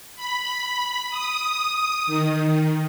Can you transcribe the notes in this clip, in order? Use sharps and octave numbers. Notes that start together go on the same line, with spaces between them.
B5
D#6
D#3